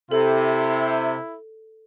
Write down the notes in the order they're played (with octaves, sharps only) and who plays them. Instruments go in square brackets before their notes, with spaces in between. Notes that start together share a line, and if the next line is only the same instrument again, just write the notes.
[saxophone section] C3 [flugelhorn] E4 [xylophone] A4